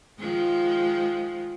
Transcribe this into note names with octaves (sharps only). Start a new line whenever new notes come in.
D#3 F3 G#3